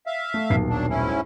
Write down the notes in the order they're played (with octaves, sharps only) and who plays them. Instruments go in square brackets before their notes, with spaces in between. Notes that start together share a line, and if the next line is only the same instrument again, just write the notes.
[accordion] E5 F5
[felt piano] A3
D#1 B1 C7
[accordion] F#3 D4
G#2 C#4 E4